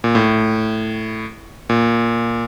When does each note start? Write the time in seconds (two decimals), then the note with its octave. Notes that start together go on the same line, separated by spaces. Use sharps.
0.04 A#2
0.15 A2
1.69 A#2